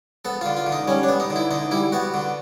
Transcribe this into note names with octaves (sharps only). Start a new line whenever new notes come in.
B3 A4
D3 F4
F4
D3
D#4
G3 C#4
D4
B3
D#4
D3
E4
D3 D#4
G3 E4
B3 F#4
D3